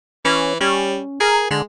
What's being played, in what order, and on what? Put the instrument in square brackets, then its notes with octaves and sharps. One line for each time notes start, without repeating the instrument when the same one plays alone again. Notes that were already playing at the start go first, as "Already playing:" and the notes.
[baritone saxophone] E3 [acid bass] C#4
[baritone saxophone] G3 [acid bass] C#4
[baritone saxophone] G#4 [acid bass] A#4
[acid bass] D3 [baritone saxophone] G#3